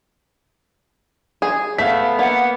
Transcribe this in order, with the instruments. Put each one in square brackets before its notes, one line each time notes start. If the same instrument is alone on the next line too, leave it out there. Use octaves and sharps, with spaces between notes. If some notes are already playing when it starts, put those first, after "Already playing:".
[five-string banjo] G#4
[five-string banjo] A3 [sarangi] B3 [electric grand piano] F5 B6
[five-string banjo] A#3 [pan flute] F#5